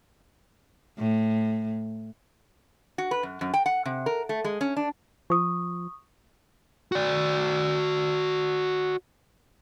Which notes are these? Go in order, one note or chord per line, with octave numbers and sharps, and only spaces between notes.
A2
F#4
B4
F#2
F#2
G5
F#5
C3
A#4
A3
G#3
C#4
D4
F3 C#6 D#6
F#4 D5